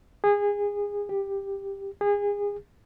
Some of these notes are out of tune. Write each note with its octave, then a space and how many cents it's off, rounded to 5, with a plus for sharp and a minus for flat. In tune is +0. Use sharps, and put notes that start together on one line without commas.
G#4 -25
G4 +10
G#4 -30